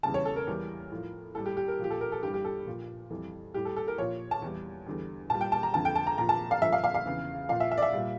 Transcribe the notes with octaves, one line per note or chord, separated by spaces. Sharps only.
E2 C#3 G3 A5
C#5
A4
A#4
E2 E3 G3
A2 F3
A2 G3 A4
G4
G4
A#4
A#2 F3 G4
A4
A#4
A4
G2 E3 G3 G4
G4
A4
A#2 F3
F2 E3 G3
A2 G3 G4
A4
A4
A#4
A#2 F3 C#5
A5
E2 E3 G3
E2 D3 G3
A#2 G3 A5
G5
A5
A#5
F2 D3 F3 A5
G5
A5
A#5
A#2 F3 A#5
A5
F5
G2 D3 F3 E5
F5
F5
F5
E2 C#3 E3
A#2 F3 F5
E5
E5
D5
E5
A#2 G3